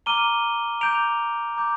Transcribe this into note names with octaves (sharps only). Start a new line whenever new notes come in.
A#5 D6 F6 D#7 G7
A#5 D6 G6 D7 F7
A#5 D6 G6